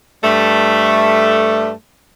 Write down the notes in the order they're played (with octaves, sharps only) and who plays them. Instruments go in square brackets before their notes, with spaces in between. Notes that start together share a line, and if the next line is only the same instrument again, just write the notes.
[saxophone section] G2 G3 A3